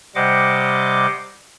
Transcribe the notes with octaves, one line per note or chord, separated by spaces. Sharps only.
C3 G3 C5 D#5 F#5 D6